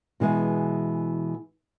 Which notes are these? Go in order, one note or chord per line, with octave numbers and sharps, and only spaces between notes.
B2 E3 G#3 G#4